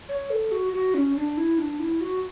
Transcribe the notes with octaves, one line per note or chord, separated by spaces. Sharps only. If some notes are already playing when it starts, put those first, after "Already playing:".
C#5
A4
F#4
F#4
C#4
D4
E4
D4
E4
F#4